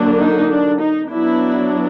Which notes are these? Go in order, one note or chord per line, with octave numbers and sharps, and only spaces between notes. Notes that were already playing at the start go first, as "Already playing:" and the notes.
Already playing: D3 F#3 A#3 D4
D#4
D4
D#4
F#3 B3 D4 E4